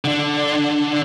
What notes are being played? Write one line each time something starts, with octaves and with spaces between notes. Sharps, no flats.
D3 D4